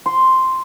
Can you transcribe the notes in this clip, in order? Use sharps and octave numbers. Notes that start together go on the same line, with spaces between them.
C6